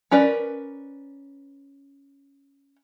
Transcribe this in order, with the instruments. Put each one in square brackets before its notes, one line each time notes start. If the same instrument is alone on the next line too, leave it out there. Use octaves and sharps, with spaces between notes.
[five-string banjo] C#4 A#4 B4 D5